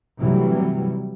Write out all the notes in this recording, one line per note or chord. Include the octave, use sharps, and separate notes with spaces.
C3 E3 F#3 G3 A3